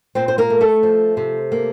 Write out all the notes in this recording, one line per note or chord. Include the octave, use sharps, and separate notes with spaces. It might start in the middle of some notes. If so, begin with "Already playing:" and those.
A#2 C4 C5
C5
A#3 A#4
A3
A3 A4
F3
C3
A#3